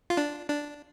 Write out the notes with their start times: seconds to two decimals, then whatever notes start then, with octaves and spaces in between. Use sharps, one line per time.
0.10 F4
0.17 D4
0.49 D4